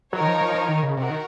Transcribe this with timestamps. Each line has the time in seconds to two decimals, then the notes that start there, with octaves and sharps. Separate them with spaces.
0.13 F#3 D#4 A#4 C#5
0.21 D#3
0.27 F3
0.41 F3
0.55 F3
0.68 D#3
0.83 C#3
0.97 C3 F#4 A#4
1.10 D#3